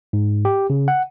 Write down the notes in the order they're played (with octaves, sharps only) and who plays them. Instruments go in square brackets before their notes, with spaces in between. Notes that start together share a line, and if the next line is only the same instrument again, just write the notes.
[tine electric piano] G#2
G4
C#3
F#5